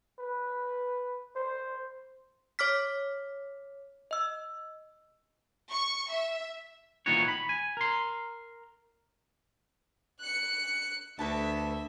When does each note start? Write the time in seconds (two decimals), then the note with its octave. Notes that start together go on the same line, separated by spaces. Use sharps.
0.19 B4
1.36 C5
2.59 C#5 D6 F6 B6
4.11 D#5 E6
5.71 C#6
6.10 E5
7.06 A#2 D#3 E3 B3 F#4 C#5
7.28 B5
7.49 G#5
7.77 A#4 C6
10.20 F#6 C#7
11.19 D2 A4 B4 E5 A5